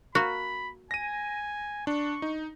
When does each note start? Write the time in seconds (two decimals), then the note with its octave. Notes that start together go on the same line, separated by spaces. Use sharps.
0.15 A#3 F#4 B5
0.91 G#5 A#6 D#7
1.87 D4 C#6
2.22 D#4